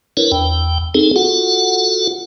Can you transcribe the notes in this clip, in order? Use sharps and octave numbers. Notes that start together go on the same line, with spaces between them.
D4 E4 A#4 B4 C#5
E2 G5
C4 D#4 G#4 A4
F4 F#4 A4 F#5